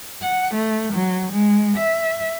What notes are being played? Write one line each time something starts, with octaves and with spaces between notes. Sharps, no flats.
F#5
A3
F#3
G#3
E5